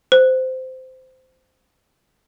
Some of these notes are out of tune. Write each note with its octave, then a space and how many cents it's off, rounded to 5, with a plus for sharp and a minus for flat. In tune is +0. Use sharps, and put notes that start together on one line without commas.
C5 -15